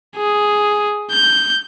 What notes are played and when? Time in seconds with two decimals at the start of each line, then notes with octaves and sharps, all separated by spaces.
0.16 G#4
1.11 G6